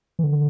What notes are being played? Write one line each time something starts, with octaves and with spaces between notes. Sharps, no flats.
E3
D3